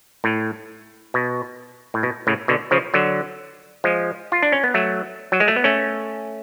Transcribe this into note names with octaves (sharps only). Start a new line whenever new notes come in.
A2
B2
A2
B2
A2 C#3
B2 D3
C#3 F3
D3 F#3
F3 G#3
F4
D4
C#4
B3
F#3 A3
F#3
G#3
A3
B3
A3 C#4